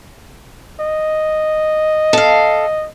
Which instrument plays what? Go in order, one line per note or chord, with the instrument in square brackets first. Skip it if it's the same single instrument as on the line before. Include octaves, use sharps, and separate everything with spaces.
[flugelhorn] D#5
[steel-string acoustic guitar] A4 F5